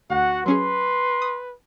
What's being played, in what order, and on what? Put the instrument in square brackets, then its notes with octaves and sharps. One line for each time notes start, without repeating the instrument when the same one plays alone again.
[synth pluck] D2 [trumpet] F#4 [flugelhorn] F#5
[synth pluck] F#3 C#4 G#4 [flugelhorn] B4 [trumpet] C6
[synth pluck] D#6